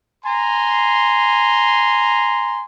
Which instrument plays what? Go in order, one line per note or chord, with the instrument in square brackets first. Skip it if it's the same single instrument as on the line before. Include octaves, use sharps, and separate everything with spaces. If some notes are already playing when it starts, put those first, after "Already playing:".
[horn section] G#5 A#5 C6